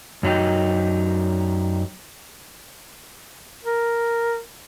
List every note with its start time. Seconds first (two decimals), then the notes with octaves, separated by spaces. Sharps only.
0.23 F#2 F#3 D#4 G4
3.65 A#4